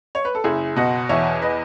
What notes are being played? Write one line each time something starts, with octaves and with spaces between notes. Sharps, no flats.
C#5
B4
A4
F#1 E4 G#4
B2 D#5 F#5
E2 C#5 E5
B4 D#5